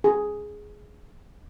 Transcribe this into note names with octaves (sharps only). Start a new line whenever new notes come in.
G#4